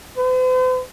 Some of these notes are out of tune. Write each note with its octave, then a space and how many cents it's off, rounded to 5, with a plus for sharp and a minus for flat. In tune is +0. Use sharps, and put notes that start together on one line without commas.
C5 -45